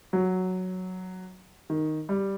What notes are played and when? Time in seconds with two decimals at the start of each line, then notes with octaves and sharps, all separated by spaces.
0.13 F#3
1.70 D#3
2.09 G3